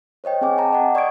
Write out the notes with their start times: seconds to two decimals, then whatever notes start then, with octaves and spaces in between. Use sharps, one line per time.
0.24 C5 C#5 D#5 G5
0.41 C4 G#4 F#5 G#5 D6
0.58 G5 A5 A#5
0.73 D#5 F#5
0.95 D5 C#6 D#6 G#6 D7